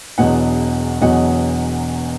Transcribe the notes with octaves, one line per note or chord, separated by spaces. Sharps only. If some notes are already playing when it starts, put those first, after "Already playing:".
E1 E2 B2 F#3 D#5 F#5
E1 E2 B2 F#3 D#5 F#5